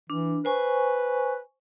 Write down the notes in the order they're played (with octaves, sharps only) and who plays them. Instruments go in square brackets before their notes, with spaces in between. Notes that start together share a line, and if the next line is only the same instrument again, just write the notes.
[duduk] E3 [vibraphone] D4
[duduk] B4 [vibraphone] C5 G#5 C#6